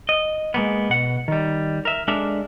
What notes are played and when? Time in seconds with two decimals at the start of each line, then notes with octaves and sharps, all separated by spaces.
0.09 D#5
0.54 G#3 A#3 B3
0.89 B2 F#5
1.28 D#3 G3
1.85 A#4 E5
2.08 G#3 D4 A4 A#4 E5